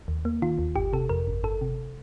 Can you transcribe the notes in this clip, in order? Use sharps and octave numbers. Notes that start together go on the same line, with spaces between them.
D#2
A#3
D#3 F4
D#2
G1 G4
C3 A4
F2 A#4
G1
G1 A4
C3